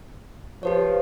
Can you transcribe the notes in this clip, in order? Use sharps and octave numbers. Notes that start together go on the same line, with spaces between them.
F3 G4 B4 C#5